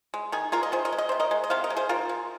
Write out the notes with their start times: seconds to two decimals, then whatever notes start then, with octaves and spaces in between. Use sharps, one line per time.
0.14 G#3
0.32 D#3 D#4 G#4
0.52 G#3 F4 A#4
0.63 D#5
0.72 D#3 G#4 C5
0.85 A#4 D#5
0.92 G#3
0.98 D#5
1.09 C3 C5
1.20 A#4 D#5
1.31 G#3
1.44 D#5
1.50 C3 C5 F5
1.64 A#4 D#5
1.70 G#3
1.77 G#4 C5
1.89 D#3 F4 A#4
2.09 G#3